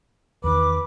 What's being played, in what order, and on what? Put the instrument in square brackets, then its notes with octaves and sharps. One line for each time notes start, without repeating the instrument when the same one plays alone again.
[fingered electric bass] E2 D#3 [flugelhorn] B4 [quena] D6